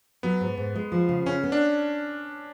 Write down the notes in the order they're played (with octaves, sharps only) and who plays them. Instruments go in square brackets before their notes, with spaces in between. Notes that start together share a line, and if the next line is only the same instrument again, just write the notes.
[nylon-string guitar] F#3 [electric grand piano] B3
[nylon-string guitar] G#2
G#2
G#3
F3
C#3
[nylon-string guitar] C#3 [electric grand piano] C#4
[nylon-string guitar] B3
[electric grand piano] D4